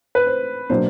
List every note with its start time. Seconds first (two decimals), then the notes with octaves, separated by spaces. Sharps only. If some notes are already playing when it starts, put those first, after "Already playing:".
0.15 B4
0.27 C5
0.70 B2 F#3 A#3 D4 C5